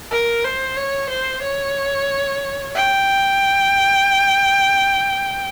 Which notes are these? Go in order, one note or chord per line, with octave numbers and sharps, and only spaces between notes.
A#4
C5
C#5
C5
C#5
G5